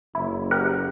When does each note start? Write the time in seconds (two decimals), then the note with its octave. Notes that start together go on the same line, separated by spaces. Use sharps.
0.15 F#1 E4
0.51 G4 A#4 F#5